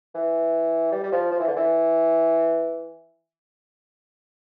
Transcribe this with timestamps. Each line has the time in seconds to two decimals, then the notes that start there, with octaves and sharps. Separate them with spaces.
0.15 E3
0.92 G3
1.03 G3
1.12 F3
1.31 F3
1.40 E3
1.47 D3
1.56 E3